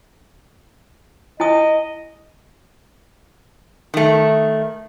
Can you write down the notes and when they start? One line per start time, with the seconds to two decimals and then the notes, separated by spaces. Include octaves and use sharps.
1.40 E4 D#5 G#5 D#6
3.94 D#3 A3